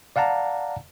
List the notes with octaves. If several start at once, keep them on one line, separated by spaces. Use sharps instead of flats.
D5 F5 F#5 A5 A#5